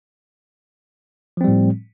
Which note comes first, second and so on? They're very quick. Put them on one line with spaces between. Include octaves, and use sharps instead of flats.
F3 C4 G3 A2